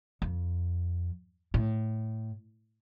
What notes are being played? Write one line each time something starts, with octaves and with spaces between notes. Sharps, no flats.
F2
A2